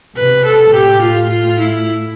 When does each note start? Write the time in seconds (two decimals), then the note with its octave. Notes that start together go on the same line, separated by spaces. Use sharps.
0.16 C3 B4
0.45 A4
0.73 A2 G4
1.01 F4
1.30 F4
1.59 E4